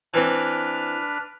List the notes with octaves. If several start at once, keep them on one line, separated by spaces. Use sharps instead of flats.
E3 C4 D4 B4 F6